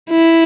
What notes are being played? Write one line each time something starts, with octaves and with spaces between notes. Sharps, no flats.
E4